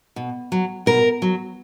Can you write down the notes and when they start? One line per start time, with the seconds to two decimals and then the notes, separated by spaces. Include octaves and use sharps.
0.16 B2
0.52 F#3
0.86 B2 A#4
1.22 F#3